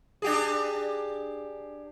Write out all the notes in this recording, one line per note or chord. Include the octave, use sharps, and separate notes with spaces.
D4 G4 G#4